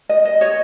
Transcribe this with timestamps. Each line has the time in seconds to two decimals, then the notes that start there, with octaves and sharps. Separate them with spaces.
0.09 D#5
0.25 D#5
0.41 C#5 D#5